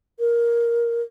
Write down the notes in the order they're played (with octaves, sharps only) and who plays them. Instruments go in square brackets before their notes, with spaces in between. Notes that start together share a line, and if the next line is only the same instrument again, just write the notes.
[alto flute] A#4